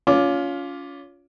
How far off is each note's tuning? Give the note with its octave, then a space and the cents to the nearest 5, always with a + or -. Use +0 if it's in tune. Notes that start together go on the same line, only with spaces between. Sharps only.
C#4 +30 F4 +10 D6 +0